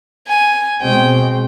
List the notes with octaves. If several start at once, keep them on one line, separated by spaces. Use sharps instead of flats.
G#5
B2 G#3 C4 G5